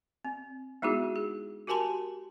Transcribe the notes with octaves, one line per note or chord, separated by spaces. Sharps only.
C4
G#3 B3 D#4 E4 F#4 G#4
G#4
F#4 G4 A#4 G#5 A5 C6